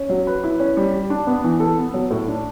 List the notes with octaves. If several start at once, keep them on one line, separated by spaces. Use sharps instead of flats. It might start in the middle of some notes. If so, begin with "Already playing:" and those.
Already playing: C#4
F#3
B4
E4
C#4
G3
G4
D4
B3
E3
A4
B3
F#3
A2
D4